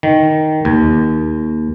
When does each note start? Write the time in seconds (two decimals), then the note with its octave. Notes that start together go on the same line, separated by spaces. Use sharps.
0.03 D#3
0.65 D#2